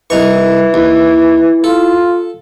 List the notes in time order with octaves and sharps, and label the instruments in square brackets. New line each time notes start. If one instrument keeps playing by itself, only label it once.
[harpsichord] C2 D#4 C#6 [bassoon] E3
[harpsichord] D#2 [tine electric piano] E4
[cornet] F4 [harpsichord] A4